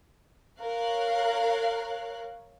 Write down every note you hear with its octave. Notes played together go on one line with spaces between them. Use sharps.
A#4 C#5 F5 F#6